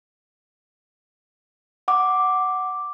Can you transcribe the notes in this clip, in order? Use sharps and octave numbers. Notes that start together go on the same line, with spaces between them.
F#5 D6